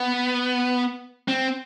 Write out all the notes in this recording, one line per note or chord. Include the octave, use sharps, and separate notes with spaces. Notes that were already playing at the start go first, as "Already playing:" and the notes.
Already playing: B3
C4